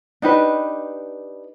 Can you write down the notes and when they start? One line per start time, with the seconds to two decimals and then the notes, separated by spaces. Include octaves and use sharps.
0.22 D4 D#4 G4 B4